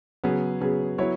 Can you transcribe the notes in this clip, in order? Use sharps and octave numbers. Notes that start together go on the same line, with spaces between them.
C#3 F#3 B3 G#4
C#3 F#3 B3 G#4
F#3 B3 E4 C#5